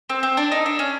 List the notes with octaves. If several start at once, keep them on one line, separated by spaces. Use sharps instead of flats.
C4
C4
D4
D#4
D4
C#4